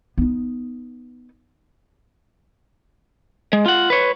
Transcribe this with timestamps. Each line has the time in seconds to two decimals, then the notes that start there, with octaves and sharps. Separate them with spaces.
0.18 B3 D#4
3.53 G#3
3.66 F4 F#5
3.90 B4 C#5